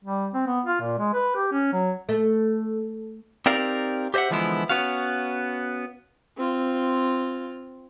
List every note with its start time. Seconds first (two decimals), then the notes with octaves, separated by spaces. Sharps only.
0.04 G3
0.33 C4
0.47 B3
0.65 F4
0.81 A#2
0.98 G#3
1.14 B4
1.35 G4
1.52 C#4
1.73 F#3
2.09 A3
3.46 C4 D#4 G4 A#4 D5 F5
4.14 G4 C5 D#5 E5 F#5
4.30 D3 E3 F3 G#3 B3 E4
4.70 B3 C#4 F#4 F5
6.37 C4 F4